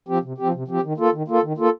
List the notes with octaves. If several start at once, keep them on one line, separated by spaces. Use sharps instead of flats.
F3 C4 G4
C3
F3 C4 G4
C3
F3 C4 G4
D#3
A#3 F4 A4
D#3
A#3 F4 A4
D#3
A#3 F4 A4